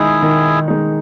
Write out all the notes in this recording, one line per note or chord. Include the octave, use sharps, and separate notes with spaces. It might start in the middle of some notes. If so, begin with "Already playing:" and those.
Already playing: D#3 G#3 D#4 E4 G#4
D#3
G#3 D#4